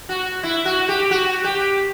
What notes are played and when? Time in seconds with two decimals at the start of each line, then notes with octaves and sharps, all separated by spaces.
0.09 F#4
0.43 E4
0.65 F#4
0.89 G4
1.11 F#4
1.44 G4